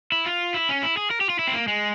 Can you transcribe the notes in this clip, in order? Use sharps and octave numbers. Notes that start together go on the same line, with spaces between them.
E4
F4
E4
C#4
E4
G#4
A#4
G4
F4
E4
C4
A#3
G#3